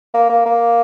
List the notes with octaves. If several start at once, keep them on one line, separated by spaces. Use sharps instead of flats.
A#3
A#3
A#3